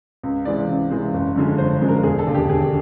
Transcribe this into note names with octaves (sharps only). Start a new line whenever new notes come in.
C#2
C3 E3 G#3 C4 D5
C#2
C3 E3 G#3 C4
F#1
F#2 D3 F3 G#3
F#1 C5
F#2 D3 F3 G#3
A#4
E1 G#4
A4
D#2 D3
G4
E1 G#4